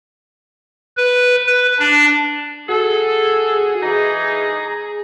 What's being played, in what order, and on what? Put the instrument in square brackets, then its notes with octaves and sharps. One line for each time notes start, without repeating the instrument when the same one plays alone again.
[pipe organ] B4
B4
D4
[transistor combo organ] F#4 [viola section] G#4 [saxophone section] A4
[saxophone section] E3 D#4 [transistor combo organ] A#5